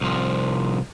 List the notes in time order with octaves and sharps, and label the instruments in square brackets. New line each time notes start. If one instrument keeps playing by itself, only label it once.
[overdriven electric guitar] C2 F3